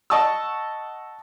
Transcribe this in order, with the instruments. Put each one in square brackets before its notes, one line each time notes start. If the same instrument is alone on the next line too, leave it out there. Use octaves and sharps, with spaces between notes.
[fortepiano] D#5 F#5 A5 C#6 D#6 E6